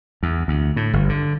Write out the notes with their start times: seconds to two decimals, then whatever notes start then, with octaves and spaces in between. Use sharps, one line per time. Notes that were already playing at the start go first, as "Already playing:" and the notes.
0.23 E2
0.48 D2
0.76 A2
0.93 G1
1.09 D3